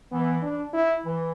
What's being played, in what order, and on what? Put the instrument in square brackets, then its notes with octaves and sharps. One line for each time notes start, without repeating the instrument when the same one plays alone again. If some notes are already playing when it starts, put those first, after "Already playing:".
[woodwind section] E3 [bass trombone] B3
[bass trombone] D4
E4
[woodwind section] E3